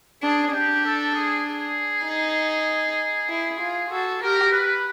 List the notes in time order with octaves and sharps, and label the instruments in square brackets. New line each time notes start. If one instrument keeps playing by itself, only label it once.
[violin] D4 [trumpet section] G#4
[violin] D4 [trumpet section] G4
[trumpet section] A4
G#4
G#4
[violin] D#4
E4
F4
[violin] F#4 [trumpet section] A4
[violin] G4 [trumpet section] A#4
[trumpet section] B4